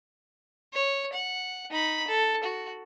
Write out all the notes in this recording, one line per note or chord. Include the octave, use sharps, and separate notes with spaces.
C#5
F#5
D#4 B5
A4
F#4